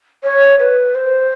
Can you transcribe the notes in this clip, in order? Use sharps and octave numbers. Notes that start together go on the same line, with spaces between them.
C#5
B4
C5